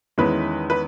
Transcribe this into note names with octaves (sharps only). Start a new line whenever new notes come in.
E2 D#3 G#3 C#4 E4 B4
B4